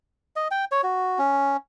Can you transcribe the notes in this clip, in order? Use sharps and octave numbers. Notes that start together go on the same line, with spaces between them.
D#5
G5
C#5
F#4
C#4